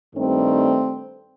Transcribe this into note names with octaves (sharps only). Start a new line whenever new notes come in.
G2 D#3 G3 A3 C4